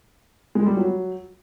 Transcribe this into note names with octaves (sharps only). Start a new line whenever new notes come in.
G#3
G3
F#3